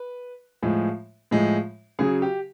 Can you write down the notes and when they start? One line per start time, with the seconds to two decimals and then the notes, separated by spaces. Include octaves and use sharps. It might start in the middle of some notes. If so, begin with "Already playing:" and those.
Already playing: B4
0.62 A2 F3 G#3
1.31 A2 F3 G#3
1.99 C#3 F#3 G#4
2.22 G4